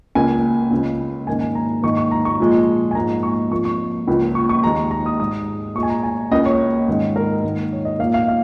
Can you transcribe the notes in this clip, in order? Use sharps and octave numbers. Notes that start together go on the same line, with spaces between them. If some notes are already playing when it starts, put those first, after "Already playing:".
C#2 C#3 A#3 G#5
C#2 C#3 G#3
G#2 D#3 A#3 G#5
G#5
A#5
G#2 D#3 A#3 C#6
C#6
A#5
C#6
A#2 F3 G#3
G#5
G#2 F3 A#3 A#5
C#6
F2 F3 A#3 C#6
C#6
C#2 C#3 F3 A#3
C#6
C#6
D#2 D#3 G#3 A#5
A#5
D#6
G#2 G#3 D#6
A#2 G#3 C#6
G#5
A#5
G#5
C#2 C#3 A#3 D#5
C#5
G#2 D#3 G#3
A#4
G#2 D#3 A#3
C#5
D#5
A#2 A#3 F5
F5
F5